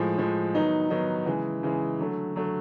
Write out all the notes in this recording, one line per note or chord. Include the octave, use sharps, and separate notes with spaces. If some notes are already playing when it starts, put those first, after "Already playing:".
Already playing: A2 F3 G#3
A2 F3 G#3
D#3 F#3 B3 D#4
D#3 F#3 B3 D#4
C#3 E3 G#3
C#3 E3 G#3
D3 F#3 A3
D3 F#3 A3